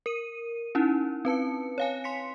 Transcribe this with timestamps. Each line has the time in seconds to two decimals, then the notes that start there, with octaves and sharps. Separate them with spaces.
0.06 A#4 D#7
0.75 C#4 D#4 E4
1.25 C4 B4 A5 C#7
1.78 C#5 F5 G#5
2.04 C6 B6 C#7